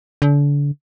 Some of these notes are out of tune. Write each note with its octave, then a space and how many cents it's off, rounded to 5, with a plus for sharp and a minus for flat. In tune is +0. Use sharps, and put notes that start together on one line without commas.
D3 -35